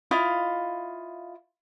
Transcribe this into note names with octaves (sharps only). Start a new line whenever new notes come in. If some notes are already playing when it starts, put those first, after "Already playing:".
E4 F4 D#5 F5